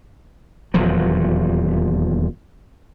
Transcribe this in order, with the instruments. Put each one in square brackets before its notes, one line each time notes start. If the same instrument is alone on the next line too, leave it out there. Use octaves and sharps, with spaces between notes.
[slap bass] D#1 E2 F3 F#3